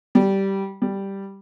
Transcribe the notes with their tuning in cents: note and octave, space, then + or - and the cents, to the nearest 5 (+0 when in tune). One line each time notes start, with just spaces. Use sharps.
G3 -10
G3 +0